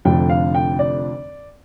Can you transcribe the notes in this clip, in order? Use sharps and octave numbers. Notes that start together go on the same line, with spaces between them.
F1 F2 D3 F3 D4 G5
F5
G5
D5